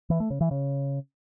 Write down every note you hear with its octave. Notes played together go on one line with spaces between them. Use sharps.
E3
A3
C#3
E3
C#3